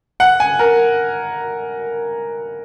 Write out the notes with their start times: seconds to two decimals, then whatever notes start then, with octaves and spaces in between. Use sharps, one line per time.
0.20 F#5
0.40 G#5
0.59 A#4